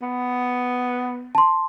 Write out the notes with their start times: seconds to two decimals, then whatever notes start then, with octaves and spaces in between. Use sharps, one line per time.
0.02 B3
1.35 A5 C6